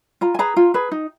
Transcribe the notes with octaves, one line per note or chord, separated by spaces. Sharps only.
F4 A#5
G#5
G#4 B4 A#5
F4
G#4 B4
D#4